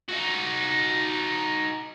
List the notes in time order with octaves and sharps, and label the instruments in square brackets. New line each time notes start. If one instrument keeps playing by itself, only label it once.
[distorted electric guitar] D#4 F#4